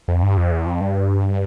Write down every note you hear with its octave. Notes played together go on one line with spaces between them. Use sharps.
F2
G2
F2
E2
F2
G2